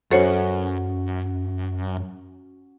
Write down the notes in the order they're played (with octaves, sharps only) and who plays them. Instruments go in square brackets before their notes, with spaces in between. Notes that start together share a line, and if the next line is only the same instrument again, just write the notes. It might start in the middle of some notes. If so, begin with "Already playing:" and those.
[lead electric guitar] F#2 [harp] C#4 F#4 [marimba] A4 C5 C#5